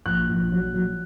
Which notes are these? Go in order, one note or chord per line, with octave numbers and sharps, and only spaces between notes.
A#1 F#6
A#1
F#3
F#3